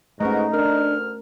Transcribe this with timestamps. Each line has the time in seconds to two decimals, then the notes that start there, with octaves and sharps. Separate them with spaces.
0.20 G#2 A3 B3 C#4 D#4 F#4 A#4
0.53 D2 D4 A#4 F6